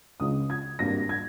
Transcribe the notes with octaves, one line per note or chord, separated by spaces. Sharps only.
C#2 C#3 G#3 D#6
G#6
G#1 G2 G3 A#3 A#6
G#6